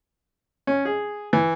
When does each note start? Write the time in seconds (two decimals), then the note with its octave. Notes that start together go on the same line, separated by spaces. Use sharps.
0.67 C#4
0.85 G#4
1.33 E3